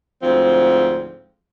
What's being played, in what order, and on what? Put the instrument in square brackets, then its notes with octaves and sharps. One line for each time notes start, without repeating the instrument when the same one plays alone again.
[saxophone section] D2 G#2 F3 C4